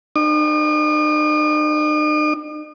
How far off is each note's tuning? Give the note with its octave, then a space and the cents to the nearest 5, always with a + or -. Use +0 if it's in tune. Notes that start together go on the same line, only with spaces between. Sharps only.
D#4 -45 D#6 -45